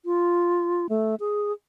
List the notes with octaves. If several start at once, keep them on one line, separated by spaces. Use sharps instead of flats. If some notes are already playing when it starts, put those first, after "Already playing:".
F4
A3
G#4